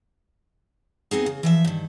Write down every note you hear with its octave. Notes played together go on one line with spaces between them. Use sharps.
B3 C4 D#4 G#4
C#3
E3 F3 E5
G2 D#3